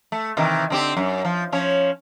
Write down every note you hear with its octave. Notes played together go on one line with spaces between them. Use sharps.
A3
C3 D#3 E3
D3 C4 G4
F#2
F3
F3 C#4 C#5